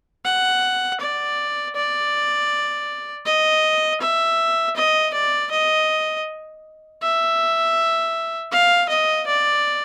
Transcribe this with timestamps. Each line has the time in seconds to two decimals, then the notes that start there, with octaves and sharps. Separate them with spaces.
0.25 F#5
1.00 D5
1.76 D5
3.26 D#5
4.01 E5
4.76 D#5
5.14 D5
5.51 D#5
7.02 E5
8.52 F5
8.89 D#5
9.27 D5